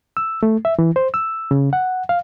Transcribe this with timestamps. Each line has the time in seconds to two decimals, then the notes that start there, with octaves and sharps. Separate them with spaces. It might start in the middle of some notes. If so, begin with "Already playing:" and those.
0.17 E6
0.43 A3
0.65 E5
0.79 E3
0.96 C5
1.14 E6
1.51 C#3
1.73 F#5
2.09 F5